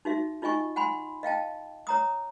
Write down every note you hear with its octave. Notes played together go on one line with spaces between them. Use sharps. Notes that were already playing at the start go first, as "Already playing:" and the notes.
D#4 F#4 E5
D#4 F4 D#5 G#5 C#6
F#5 G#5 B5 C6
D#5 F5 G5 A5
C#5 A#5 D#6